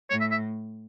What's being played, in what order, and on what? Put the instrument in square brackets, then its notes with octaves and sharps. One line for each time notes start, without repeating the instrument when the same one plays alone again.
[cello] A2 [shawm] C#5
[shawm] E5
E5